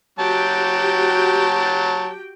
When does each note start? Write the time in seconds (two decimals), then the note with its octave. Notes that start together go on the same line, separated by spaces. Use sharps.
0.19 F#3 F#4 G4 G5 A5